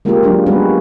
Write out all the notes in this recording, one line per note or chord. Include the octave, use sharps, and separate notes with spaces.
G#3 A#3 C#4 F4 G4 A#4
F#3 G#3 D4
G3 G#3 B3 C#4 F#4 B4